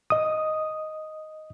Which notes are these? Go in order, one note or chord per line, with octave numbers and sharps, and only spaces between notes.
D#5 D#6